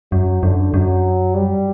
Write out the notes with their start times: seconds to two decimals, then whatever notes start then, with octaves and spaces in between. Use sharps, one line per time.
0.12 F#2 F#3
0.43 F#2 D3
0.74 F#2 F#3
1.35 G3